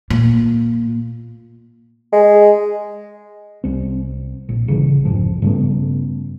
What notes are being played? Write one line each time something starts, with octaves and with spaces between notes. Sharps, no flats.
A#2
G#3
C2 C4
A#1
G1 C#3 E3
F1 B1 G#2 F3
G2 C#3 A3 B3